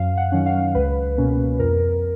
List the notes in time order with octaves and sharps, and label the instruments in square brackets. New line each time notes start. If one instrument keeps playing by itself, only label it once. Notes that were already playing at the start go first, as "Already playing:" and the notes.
Already playing: [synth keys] F#2 F5
F#5
D#3 F#3 C#4
F5
C#2 B4
B2 A#3 C#4
F2 A#4